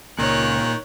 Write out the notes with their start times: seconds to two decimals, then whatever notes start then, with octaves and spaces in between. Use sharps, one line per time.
0.19 C#2 A#2 D#3 C#5 F#6